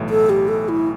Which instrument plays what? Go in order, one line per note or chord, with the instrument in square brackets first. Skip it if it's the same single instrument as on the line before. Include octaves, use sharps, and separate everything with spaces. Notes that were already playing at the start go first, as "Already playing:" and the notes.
Already playing: [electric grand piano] B1 A2 E3
[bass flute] A4
G4
A4
E4